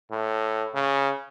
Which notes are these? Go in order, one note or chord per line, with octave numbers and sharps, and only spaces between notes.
A2
C#3